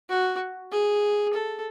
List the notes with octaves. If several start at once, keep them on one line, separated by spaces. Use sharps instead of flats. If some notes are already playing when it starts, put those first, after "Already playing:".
F#4
G#4
A4